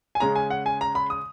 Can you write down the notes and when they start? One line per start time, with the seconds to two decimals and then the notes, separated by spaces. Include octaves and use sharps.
0.15 G#5
0.20 C#3 G#3 C#4 A#5
0.36 G#5
0.50 F#5
0.66 G#5
0.81 A#5
0.95 B5
1.10 D#6